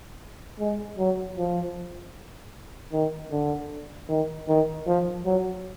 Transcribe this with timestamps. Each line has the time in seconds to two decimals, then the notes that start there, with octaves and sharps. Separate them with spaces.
0.59 G#3
0.99 F#3
1.37 F3
2.93 D#3
3.32 D3
4.09 D#3
4.48 D#3
4.87 F3
5.26 F#3